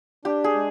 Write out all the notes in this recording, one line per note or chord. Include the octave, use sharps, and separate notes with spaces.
D4 G4
G#4
G#3